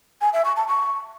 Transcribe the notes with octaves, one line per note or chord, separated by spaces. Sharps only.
G#5
E5
C#6
A5
C#6